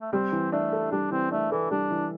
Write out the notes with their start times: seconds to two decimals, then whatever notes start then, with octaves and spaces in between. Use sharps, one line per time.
0.01 A3
0.13 G3 C4
0.32 E3
0.52 A3 D4
0.72 A4
0.92 G3 D4
1.11 E3 C4
1.31 A3 D4
1.52 E3 A4
1.71 G3 D4
1.91 E3